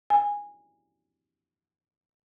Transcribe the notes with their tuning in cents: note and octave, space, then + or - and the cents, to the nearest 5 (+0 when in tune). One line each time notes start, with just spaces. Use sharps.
G#5 -15